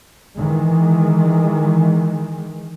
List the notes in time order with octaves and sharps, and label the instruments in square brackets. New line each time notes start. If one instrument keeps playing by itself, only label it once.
[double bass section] D#3 E3 G#3